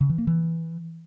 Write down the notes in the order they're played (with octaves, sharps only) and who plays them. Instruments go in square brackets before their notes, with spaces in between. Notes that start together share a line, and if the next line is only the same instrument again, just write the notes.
[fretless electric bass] C#3
E3
A#3
E3